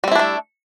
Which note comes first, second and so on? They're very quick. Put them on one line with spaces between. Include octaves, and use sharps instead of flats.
G3 C4 E4 D4 A3